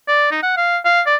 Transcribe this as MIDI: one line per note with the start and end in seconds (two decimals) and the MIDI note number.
0.08 0.28 74
0.31 0.43 63
0.43 0.57 78
0.57 0.78 77
0.85 1.01 77
1.06 1.16 74